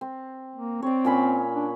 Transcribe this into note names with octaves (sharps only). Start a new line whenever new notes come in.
C4
A#3
C4 C#5 D5
A#2 C#4 B5
D4